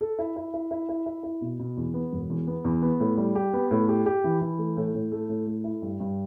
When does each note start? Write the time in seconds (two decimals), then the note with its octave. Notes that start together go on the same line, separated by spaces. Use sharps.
0.01 A4
0.19 E4
0.36 E4
0.54 E4
0.71 E4
0.89 E4
1.06 E4
1.23 E4
1.41 B2
1.59 B2
1.77 E2
1.94 B3
2.13 E1
2.30 E2
2.47 B3
2.64 E2
2.82 B3
3.00 A2
3.17 G3
3.35 G4
3.53 B3
3.71 A2
3.88 G4
4.06 G4
4.24 E3
4.41 E3
4.58 A3
4.77 A2
4.94 A2
5.12 A3
5.29 A2
5.47 A3
5.64 E4
5.82 G2
6.00 G2